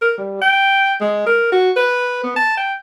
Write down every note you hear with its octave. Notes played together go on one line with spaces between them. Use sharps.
A#4
G3
G5
G#3
A#4
F#4
B4
B3
A5
G5